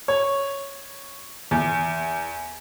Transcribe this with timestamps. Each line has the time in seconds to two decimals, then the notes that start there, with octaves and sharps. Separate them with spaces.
0.08 C#5
1.51 E2